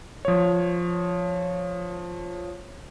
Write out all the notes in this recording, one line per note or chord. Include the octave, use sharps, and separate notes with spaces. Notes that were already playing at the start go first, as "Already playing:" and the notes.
F3 C#5